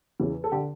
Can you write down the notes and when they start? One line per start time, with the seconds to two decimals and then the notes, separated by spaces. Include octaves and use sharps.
0.20 E2 C#3 E3
0.44 A4
0.52 D3 G4